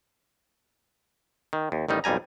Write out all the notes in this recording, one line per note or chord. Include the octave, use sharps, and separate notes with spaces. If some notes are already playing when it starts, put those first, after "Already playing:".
D#3
D#2
A1 D#3 G3 D#4
B1 F2 G3 G#5 A#5